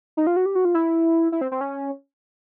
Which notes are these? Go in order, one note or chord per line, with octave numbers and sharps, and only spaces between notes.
D#4
F4
F#4
G4
F#4
F4
E4
E4
C4
C4
C#4